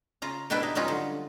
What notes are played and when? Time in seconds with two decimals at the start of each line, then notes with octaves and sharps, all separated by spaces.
0.22 C#3 F4 A#5
0.50 B2 G3 D4 E4 B4 G5
0.63 D#4
0.75 F#3 G3 C#4 D#4 F4
0.88 D3